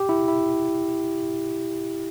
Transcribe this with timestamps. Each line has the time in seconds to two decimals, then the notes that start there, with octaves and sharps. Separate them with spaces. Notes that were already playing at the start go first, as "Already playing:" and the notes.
Already playing: G4
0.09 E4
0.28 E4